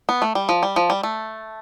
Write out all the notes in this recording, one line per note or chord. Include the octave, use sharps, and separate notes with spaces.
B3
A3
G3
F3
G3
F3
G3
A3